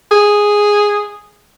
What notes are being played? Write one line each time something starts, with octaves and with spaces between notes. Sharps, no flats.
G#4